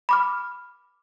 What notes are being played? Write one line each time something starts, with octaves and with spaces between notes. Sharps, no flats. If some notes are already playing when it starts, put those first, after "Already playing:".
B5 D6 F6